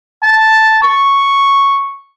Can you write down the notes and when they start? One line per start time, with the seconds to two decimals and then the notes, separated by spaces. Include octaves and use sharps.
0.24 A5
0.83 C#6